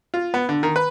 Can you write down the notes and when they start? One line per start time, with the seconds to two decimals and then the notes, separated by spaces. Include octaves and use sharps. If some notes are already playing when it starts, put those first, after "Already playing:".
0.14 F4
0.34 B3
0.49 D3
0.63 D#3
0.76 B4